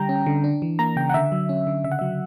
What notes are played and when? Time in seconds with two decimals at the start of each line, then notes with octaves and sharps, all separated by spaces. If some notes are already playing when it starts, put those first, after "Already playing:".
Already playing: D3 G3 G5 A#5
0.09 C#4
0.26 D3
0.44 D4
0.62 E3
0.79 A#3 A#5
0.96 C#3 G5
1.09 F#5
1.14 D3 E5
1.32 F#3
1.49 C#4
1.67 D3
1.84 C#3 E5
1.92 F#5
1.99 F#3 E5